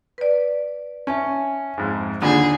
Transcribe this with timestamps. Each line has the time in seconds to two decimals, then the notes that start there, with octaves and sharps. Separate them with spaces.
0.18 B4 D5
1.07 C#4 E5 G#5 A5
1.78 F2 G#2
2.22 D#2 D3 D4 D#4 F4 G#4 B5